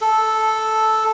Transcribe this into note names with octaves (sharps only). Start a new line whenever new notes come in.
A4